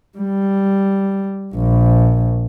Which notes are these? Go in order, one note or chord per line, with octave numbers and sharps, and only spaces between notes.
G3
A#1